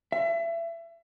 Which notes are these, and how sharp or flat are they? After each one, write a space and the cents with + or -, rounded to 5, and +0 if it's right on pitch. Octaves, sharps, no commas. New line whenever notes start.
E5 +30